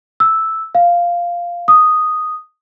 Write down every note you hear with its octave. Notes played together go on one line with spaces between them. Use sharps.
E6
F5
D#6